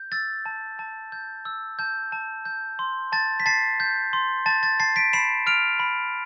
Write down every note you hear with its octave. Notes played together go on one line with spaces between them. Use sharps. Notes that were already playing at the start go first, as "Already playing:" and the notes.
Already playing: G6
E6 A6
A5
A5
G6
E6
A5 G6
A5
G6
C6
A5 A6
B6
A5 A6 C7
G6
C6
A5 A6
A6
A5 A6 C7
B6 D7
B5 C7 E7
F6 D7 F7
B5